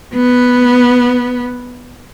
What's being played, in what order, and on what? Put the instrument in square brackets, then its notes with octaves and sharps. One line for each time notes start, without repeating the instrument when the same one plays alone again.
[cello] B3